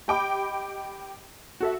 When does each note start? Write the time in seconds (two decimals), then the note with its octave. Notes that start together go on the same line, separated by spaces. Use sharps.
0.08 G4 D#5 G5 B5 D6
1.60 F#4 A4 E5